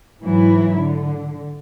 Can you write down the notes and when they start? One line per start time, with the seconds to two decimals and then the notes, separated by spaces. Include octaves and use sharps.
0.23 G#2 E3 F#3 E4
0.79 D3